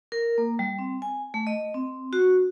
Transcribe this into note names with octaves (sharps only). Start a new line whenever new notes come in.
A#4
A#3
G3
C4
G#5
A3
D#5
C4
F#4